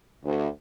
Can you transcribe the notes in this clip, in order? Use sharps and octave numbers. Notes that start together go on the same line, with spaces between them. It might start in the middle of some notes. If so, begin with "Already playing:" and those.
D2